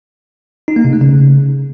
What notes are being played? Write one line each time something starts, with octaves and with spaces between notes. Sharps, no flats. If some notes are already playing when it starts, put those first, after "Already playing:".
D#4
A#3
C3
A3
C#3